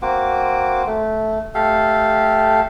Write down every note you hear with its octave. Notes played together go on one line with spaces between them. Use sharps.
A#3 C4 F#4 D6
A3
A3 G4 A4 F5